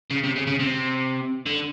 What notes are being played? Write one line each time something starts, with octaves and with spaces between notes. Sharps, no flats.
C#3
C3
C#3
C#3
C3
D3